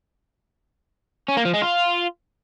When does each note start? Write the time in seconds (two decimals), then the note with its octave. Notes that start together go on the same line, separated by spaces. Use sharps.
1.28 C#4
1.37 A#3
1.45 F3
1.54 G#3
1.62 F4